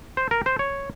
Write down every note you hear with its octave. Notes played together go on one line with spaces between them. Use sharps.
C5
A#4
C5
C#5